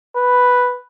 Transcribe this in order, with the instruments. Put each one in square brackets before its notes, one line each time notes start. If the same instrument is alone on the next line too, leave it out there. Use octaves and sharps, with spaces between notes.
[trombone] B4